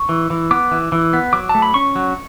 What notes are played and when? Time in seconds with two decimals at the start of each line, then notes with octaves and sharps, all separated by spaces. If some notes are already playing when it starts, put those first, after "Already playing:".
Already playing: C#6
0.09 E3
0.30 E3
0.51 B3 D6
0.71 E3
0.92 E3
1.13 B3
1.33 F#3 D6
1.49 A5
1.55 A3
1.62 B5
1.74 C#4 C#6
1.96 F#3